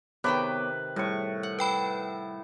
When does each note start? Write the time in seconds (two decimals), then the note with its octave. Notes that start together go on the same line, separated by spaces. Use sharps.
0.24 C3 D#3 B3 B4 C#5 G5 D6
0.96 A2 G3 C#6
1.43 F#5
1.59 B4 G5 B5